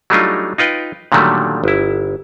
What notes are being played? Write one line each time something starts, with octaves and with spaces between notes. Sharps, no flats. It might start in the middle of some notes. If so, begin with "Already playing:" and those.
F#3 G3 A3 D4 D#4 F4
D#4 F4 B4 G5
A#2 D3 D#3 F#3 G3 A3
G1 E4